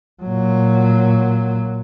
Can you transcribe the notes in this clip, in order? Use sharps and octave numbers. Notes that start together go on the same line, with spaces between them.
A#2 F#3